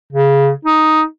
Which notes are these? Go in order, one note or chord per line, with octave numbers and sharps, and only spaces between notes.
C#3
D#4